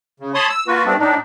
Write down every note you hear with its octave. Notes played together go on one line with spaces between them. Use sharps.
C#3
C#5 A5 B5 C6 D#6
E6
A#3 F4 F#4 B4
G3 A3 B3 C4 D4
A2 D4 D#4